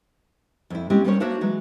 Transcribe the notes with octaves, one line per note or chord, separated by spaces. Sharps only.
F2 E4
G#3 C4 C#4 E4 G4
G3 B3 C#4 A#4 C5 C#5
A#3 D4 F#4 C5 C#5 E5
E3 F#3 G#3